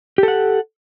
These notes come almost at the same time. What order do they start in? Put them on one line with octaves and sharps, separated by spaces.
G4 A4 F#5